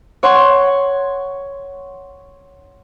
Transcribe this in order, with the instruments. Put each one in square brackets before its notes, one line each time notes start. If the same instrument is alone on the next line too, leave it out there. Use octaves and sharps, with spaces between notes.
[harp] C#5 F#5 C6 C#6